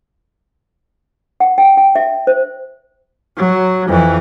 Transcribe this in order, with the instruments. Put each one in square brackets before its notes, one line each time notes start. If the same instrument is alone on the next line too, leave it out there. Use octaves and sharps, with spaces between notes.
[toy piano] F#5
G5
G5
E5
C5
[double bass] F#3
F2 E3